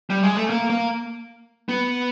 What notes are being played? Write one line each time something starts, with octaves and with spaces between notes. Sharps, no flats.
G3
G#3
A3
A#3
A#3
B3